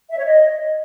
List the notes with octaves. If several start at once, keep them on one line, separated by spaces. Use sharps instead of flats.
E5
C#5
D#5